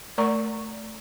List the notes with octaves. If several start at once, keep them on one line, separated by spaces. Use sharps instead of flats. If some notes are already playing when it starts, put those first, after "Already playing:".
A3 A#4 D5 A#5 C#6